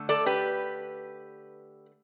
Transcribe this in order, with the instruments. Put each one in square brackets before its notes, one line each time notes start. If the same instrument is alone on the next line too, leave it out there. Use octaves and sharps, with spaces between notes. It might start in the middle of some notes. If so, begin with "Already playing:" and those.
Already playing: [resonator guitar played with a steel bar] D3 A3
A4 D5
G4 B4